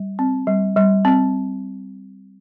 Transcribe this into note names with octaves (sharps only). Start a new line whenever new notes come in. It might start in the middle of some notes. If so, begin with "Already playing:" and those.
Already playing: G3
C4
G3
G3
C4